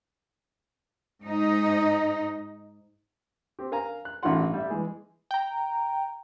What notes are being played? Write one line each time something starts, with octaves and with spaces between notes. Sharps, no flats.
G#2 D#4
C4 G4
A#4 F5 G#5 A#5
F#6
A1 G2 D#3 F4 F#5 C6
G3 E5
E3 G#3 G#4
G5 A#5